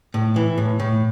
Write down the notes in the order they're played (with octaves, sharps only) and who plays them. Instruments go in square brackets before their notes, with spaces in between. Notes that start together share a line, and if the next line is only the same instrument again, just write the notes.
[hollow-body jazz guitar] A2
E3
A2
A2